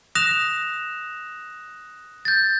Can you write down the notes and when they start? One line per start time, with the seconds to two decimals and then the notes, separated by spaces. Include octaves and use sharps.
0.15 D#6 F#6 A#6 E7 F7
2.25 G6 A6